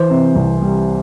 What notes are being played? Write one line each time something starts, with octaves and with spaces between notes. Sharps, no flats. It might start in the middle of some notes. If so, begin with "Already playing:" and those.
Already playing: E3 C5
C3
C2
G3